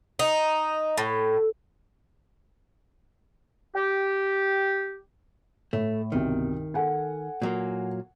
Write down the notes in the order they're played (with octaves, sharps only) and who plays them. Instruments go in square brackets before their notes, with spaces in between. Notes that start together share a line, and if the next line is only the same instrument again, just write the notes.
[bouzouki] D#4
A2
[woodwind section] G4
[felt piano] A2 [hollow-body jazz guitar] A3
[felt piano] G1 C2 B2 [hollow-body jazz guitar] D#3
[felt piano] A4 F#5 G#5
[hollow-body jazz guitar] A#2 F#3 A#3